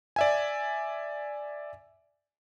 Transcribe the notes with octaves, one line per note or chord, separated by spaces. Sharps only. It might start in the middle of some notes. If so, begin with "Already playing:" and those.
D5 E5 G#5